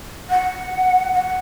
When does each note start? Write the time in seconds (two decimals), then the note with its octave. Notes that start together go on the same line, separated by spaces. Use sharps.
0.30 F#5
1.13 F#5